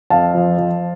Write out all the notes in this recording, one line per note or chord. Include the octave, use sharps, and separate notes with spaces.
F2 F5 A5
F3
F3